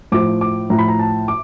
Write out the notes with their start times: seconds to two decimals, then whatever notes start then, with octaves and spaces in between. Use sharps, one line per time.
0.12 A2 F3 D6
0.41 D6
0.70 A2 F3 A#5
0.79 B5
0.88 A#5
0.99 A5
1.28 D6